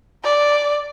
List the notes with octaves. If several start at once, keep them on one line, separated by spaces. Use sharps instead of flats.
D5